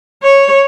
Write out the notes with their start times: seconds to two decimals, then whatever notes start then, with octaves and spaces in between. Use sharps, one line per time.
0.23 C#5